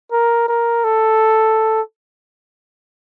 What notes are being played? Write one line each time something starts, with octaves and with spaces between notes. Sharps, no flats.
A#4
A#4
A4